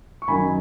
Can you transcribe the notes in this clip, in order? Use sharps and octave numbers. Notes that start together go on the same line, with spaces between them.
C#6
F#2 D#3 F#3 G#5 B5